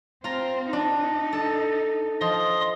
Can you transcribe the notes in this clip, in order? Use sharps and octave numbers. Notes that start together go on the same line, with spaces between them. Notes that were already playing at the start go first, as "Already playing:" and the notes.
C4 F4 A#5
D4 D#4
A4
F3 D#5 C6 D#6